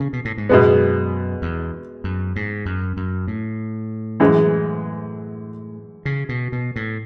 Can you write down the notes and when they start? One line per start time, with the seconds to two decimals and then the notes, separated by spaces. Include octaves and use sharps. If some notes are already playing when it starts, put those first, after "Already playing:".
0.00 C#3
0.13 B2
0.25 A2
0.38 G#2
0.49 F#2 B2 G#3 B3
1.42 E2
2.04 F#2
2.36 G#2
2.66 F#2
2.97 F#2
3.28 A2
4.20 F#2 E3 G#3
6.05 C#3
6.29 B2
6.52 B2
6.76 A2